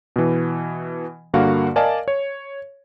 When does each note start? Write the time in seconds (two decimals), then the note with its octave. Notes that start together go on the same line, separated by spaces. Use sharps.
0.16 B2 E3
1.34 G2 D3 A#3 F#4 F5 F#5
1.76 A#4 D5 D#5 F5 G#5 A5
2.08 C#5